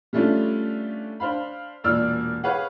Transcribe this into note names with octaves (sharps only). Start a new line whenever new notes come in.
G3 A3 C#4 D4 F4
D4 C5 F5 B5
E1 A#2 D5 E6 F6
G#4 B4 C#5 F5 F#5